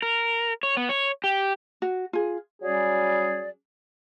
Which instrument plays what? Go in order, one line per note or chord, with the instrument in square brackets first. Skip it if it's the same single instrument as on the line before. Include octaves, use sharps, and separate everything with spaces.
[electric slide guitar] A#4
C#5
B3
C#5
G4
[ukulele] F#4
F4 G#4
[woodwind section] F#3 G3 C#4 G#4 D5